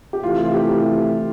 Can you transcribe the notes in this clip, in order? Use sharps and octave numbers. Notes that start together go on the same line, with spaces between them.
G4
C3 E3 A3 E4 F4
F4
G4